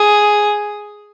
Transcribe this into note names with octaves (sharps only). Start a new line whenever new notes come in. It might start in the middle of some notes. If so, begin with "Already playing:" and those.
Already playing: G#4